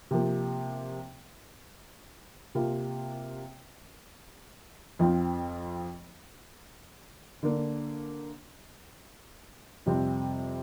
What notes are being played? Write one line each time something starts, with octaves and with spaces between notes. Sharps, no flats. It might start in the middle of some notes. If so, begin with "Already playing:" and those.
C3 F3 A#3
C3 A#3 F4
F2 F3 C4 F4
D3 A#3 D4
F2 C3 G3 C4